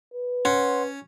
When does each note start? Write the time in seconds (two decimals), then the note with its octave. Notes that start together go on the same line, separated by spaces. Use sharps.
0.14 B4
0.45 C#4 C#5 F#5 C6